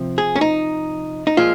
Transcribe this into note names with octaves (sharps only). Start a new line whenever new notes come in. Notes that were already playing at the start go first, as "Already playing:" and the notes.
Already playing: C3 F3 C4
G#4
C#4
D#4
D#4
A#2 F3 G#3 F4